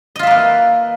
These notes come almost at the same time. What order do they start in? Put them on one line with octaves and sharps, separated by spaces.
D#5 F4 E5 A#3 B4